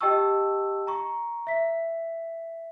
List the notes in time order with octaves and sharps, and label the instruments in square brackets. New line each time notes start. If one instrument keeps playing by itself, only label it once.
[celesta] G4 D#5 G5 A5 C#6 E6
A#5 C#6
E5 B6